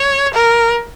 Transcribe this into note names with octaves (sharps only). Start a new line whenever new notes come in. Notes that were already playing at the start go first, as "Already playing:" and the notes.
Already playing: C#5
A#4